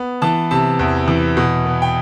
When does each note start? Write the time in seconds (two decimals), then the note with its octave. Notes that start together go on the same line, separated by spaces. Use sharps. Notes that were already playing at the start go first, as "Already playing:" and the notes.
Already playing: B3
0.22 E3 A5
0.51 C3 A5
0.79 E2
1.08 E3
1.37 B2
1.66 B3
1.82 G5